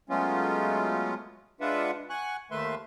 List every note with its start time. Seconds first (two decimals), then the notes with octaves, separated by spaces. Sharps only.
0.10 F#3 G#3 A3 B3 C#4 F4
1.61 G#3 D4 F4 B4 E5 F#5
2.10 F#5 G#5 C#6 F#6
2.51 D#2 D#3 A3 B4 E5 C6